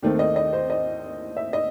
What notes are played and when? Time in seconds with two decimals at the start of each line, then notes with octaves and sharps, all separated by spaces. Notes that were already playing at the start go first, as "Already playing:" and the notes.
0.03 D#2 D#3 A3 C4
0.19 D#5
0.36 D#5
0.53 C5
0.70 D#5
1.37 E5
1.53 D#5